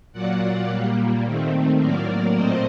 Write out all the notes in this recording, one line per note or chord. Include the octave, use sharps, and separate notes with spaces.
A#2 F#3 A#3 D5 F#5
A#2 G3 A#3
D#3 A3 C4
A2 F#3 A#3 A#4 D5
A#2 A3 C4 C5 D#5